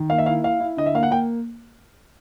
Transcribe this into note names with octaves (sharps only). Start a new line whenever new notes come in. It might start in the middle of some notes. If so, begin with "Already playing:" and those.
Already playing: D#3
A#3 F5
E5
E4 F5
E4 F5
E4
D3 D#5
E5
A#3 F5
F#5
A#3 G5